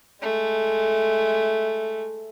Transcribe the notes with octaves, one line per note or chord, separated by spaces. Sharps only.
G#3 A3